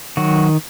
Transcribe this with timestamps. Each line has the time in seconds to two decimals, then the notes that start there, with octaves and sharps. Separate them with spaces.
0.17 D#3 F#3 F#4